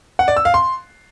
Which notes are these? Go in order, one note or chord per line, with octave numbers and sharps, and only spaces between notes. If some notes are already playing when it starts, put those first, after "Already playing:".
F#5
D5
E6
F5
C6